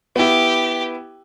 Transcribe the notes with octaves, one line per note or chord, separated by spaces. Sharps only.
B3 E4 G4